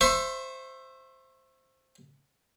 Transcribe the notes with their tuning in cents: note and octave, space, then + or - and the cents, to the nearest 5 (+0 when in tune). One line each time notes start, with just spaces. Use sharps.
C5 +0 E5 +15 C#6 -30